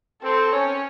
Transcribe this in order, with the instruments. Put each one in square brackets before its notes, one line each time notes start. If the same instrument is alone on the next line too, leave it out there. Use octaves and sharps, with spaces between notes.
[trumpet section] C4 [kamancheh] A4
[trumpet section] C#4 [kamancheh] C#5